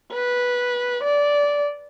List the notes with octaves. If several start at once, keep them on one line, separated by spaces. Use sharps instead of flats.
B4
D5